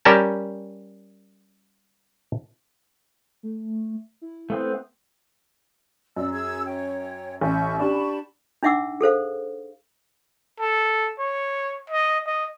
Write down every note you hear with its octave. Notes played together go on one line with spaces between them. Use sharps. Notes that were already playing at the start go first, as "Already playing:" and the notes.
G3 C#4 A#4 G5 A5
A3
E4
A3 B3 C4
F#2 D5 E6
G#4 E6 G#6
C#5 G5
A1 E5 C#6 G6
D4 G4 A5 B5 C#6
D4 D#4 E5 F#5 D6 E6
G#4 A4 C5 F5
A4
C#5
D#5
D#5